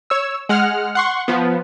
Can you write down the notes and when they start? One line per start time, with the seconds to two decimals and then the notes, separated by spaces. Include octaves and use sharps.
0.10 C#5 E6
0.49 G#3 F#5 F6
0.95 F#5 C6 C#6
1.28 F3 B3